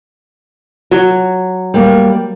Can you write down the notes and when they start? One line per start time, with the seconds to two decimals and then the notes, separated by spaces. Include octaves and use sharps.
0.91 F#3
1.74 G3 A#3